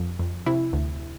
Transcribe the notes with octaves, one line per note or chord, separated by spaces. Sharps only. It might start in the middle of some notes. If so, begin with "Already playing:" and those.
Already playing: F2
F2
C3 E4
D2